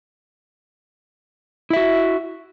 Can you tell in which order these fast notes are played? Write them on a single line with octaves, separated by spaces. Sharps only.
E4 E5 F#4